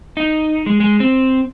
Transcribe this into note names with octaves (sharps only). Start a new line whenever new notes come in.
D#4
G#3
G#3
C4